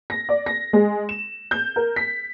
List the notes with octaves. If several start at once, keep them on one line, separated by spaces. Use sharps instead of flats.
A#6
D5
A#6
G#3
E7
G6
A#4
B6